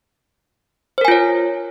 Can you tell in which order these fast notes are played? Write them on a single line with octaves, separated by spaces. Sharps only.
C5 A#4 G#5 F4 C#5